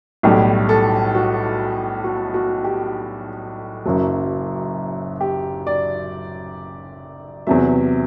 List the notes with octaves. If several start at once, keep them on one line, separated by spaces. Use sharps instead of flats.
B1 A2 G3 G4
A4
F#4
F#4
F#4
G4
F#1 F#2 F#3
G4
D5
E2 C3 F#3 E5